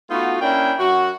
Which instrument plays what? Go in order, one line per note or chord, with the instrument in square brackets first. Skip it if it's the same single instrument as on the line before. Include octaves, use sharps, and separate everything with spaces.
[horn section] A3 B3 D#4 F4 F#4
A#3 C#4 D4 E4 G5
F#2 F#4